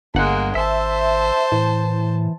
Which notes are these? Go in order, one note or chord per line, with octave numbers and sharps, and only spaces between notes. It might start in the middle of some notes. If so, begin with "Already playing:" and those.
G1 G#3 A#3 F#5
G#1 C5 E5 A5
A2 E3